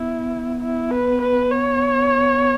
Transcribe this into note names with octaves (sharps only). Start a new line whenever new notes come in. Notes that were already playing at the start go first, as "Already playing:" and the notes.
Already playing: B3 E4
E4
B4
B4
C#5